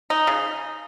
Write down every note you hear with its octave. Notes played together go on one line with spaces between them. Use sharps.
D#4
C#3